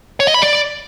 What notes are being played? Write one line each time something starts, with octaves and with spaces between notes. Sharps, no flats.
C#5
D#5
B5
D5